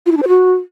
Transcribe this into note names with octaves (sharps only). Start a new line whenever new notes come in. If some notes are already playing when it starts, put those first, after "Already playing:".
F4
E4
D4
C5
F#4